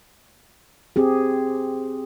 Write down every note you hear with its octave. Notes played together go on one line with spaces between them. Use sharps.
C4 G4 G#4